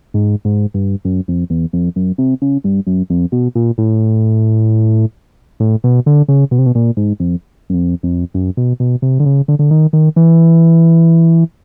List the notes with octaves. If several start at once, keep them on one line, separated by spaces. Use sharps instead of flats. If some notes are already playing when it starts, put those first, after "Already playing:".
G#2
G#2
G2
F#2
F2
E2
F2
F#2
C3
C#3
G2
F#2
F2
B2
A#2
A2
A2
B2
D3
C#3
B2
C3
B2
A#2
G#2
F2
F#2
F2
F2
F#2
B2
B2
C3
D3
C#3
D3
D3
D#3
D#3
E3